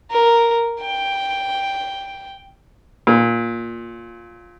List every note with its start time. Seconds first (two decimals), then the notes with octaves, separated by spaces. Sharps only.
0.11 A#4
0.81 G5
3.07 A#2